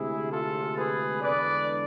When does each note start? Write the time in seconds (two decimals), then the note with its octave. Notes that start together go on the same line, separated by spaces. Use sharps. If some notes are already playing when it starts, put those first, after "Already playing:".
Already playing: D2 C3 G#3 E4 G#4
0.32 F4 A4
0.78 G#4 B4
1.22 E2 D3 G#3 D4 B4 D5